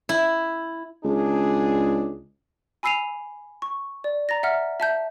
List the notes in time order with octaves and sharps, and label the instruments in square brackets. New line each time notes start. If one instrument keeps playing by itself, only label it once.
[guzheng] E4
[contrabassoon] C#2 [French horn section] D4 G#4
[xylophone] G#5 B5 E6 C7 D#7 F7
C#6
D5
A#5 A6 A#6
E5 F#5 F6
E5 A5 G6